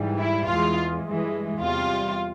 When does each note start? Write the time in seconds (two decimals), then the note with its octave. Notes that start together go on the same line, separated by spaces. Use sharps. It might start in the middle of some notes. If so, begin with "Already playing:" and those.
Already playing: G#2 E3 G3
0.19 E4
0.47 E2 E3 G#3 F4
1.04 G2 E3 G#3
1.60 E2 C3 G3 F4